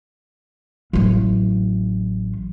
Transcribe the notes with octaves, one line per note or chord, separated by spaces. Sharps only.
A1 F#3